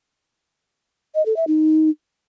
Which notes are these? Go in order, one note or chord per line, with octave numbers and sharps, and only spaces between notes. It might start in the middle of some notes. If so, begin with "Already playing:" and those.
D#5
A4
E5
D#4